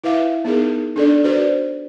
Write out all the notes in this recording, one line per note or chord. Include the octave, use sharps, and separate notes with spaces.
E4 B4 E5 F5
B3 D#4 G#4 A#4
D4 A4 D5
F#4 B4 C5 D5